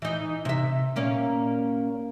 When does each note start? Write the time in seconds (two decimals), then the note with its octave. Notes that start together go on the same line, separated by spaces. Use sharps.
0.02 E3 D#4
0.45 C3 E5
0.96 A#2 A#3 C#4